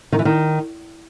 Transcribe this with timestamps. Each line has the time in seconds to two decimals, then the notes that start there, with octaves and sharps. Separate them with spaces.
0.12 D#3
0.19 E3
0.25 D#3